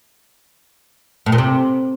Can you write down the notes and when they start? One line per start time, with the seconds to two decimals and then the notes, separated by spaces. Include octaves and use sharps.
1.26 A2
1.32 A#2
1.38 C3